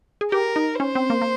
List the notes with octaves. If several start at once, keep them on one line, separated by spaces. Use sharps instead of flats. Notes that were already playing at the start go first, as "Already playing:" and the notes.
G#4
G4 A#4
D#4
C#4 C5
C4
A#3
A#3